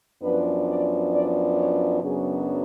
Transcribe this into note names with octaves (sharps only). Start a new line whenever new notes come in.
F#2 F3 B3 D4 B4
D5
D5
C#5
F#2 C#3 F#3 B3 D4 G#4